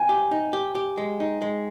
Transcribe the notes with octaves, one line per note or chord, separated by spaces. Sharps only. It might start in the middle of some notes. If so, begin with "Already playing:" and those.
Already playing: G5 G#5
G4
D#4
G4
G4
G#3
D#4
G#3